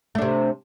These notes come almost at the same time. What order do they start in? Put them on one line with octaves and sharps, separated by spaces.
A3 D4 C3